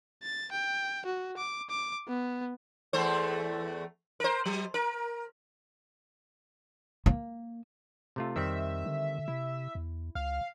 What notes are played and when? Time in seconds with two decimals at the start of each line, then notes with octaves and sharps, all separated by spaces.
0.23 A6
0.51 G5
1.05 F#4
1.37 D6
1.70 D6
2.08 B3
2.93 E2 A3 C5
4.20 A#4 C5
4.45 F#3
4.74 A#4
7.06 A#3
8.16 C3 A3 F4
8.36 F2 D#3 G3 C4 E5
8.86 D3
9.28 C3 E4
9.75 E2
10.15 C#2 F5